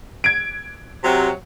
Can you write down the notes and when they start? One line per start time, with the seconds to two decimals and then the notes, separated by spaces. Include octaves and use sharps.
0.24 G#6 D7
1.04 C3 F#3